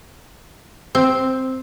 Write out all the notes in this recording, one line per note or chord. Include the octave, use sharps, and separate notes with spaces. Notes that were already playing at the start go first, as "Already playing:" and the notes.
C4